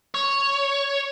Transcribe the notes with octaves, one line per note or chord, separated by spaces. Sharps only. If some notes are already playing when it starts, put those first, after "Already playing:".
C#5